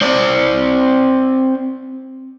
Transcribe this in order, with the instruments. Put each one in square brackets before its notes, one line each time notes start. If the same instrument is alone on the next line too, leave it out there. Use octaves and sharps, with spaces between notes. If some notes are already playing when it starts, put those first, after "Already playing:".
[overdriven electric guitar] C4 D5